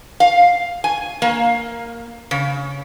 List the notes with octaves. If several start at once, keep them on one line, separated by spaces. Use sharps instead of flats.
F5
G#5
A#3
C#3